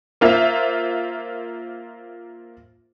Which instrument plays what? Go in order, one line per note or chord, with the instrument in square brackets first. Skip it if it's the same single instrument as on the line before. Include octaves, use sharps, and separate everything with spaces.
[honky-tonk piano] A#3 F4 C5 E5